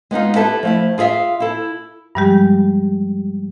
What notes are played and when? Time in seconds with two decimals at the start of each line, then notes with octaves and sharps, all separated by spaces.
0.11 G#3 B3 D#4 F4
0.35 E4 G4 A4 B4 E5
0.63 F3 A3 E4
0.98 F4 G#4 D5 E5 F5
1.40 E4 A4
2.15 G2 F3 G3 G#3 G4